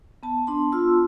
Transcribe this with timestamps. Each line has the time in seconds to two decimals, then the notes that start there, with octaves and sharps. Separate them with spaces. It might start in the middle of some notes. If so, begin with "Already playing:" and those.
0.23 B3 A5
0.47 D4 C6
0.72 F4 E6